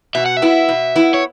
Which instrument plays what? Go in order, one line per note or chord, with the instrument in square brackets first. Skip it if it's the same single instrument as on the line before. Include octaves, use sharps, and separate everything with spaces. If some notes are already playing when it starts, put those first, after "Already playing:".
[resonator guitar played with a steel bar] B2 [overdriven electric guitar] E5
[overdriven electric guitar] F#5
E5
[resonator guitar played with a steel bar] B3 E4
B2
B3 E4
[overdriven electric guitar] C#5